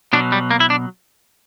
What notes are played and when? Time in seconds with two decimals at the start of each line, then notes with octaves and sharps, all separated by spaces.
0.13 B2 F#3 D4
0.32 G3
0.51 A#3
0.60 E4
0.70 D4